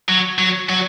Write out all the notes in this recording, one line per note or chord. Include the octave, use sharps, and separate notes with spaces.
F#3
F#3
F#3